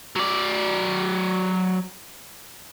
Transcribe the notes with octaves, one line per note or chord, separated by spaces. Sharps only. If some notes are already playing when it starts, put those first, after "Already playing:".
F#3 D5